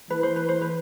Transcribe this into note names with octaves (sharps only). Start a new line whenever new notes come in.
E3 B4
C5
B4
C5
B4